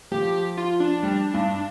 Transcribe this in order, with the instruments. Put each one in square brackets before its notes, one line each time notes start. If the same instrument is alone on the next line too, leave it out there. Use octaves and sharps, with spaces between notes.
[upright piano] F3 [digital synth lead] G4
[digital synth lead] F4
D4
[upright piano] G3
G2